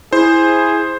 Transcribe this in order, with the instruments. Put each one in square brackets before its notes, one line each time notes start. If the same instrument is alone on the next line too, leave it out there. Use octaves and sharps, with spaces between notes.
[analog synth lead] E4 [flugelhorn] G#4 [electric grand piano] C5